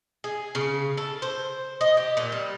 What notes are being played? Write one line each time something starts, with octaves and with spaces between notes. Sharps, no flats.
G#4
C#3
A4
C5
D#5
G4
A#2
G3